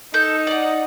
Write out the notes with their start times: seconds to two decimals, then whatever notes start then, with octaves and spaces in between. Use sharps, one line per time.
0.14 D#4 A4 G6
0.47 D5 F#5